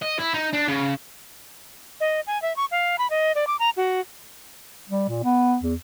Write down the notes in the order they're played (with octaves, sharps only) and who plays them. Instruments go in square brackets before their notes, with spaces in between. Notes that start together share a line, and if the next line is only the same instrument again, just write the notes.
[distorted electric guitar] D#5
E4
D#4
D4
C#3
[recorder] D#5
G#5
E5
C#6
F5
B5
D#5
D5
D6
A#5
F#4
[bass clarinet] G3
A#2
B3
E2